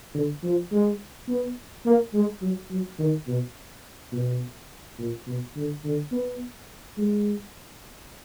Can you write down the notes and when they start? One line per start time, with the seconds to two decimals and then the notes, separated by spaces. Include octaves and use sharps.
0.14 D3
0.43 F3
0.71 G#3
1.28 B3
1.85 A#3
2.13 G#3
2.42 F#3
2.70 F#3
2.99 D#3
3.27 B2
4.12 B2
4.98 A#2
5.27 B2
5.55 D3
5.84 D3
6.11 B3
6.98 G#3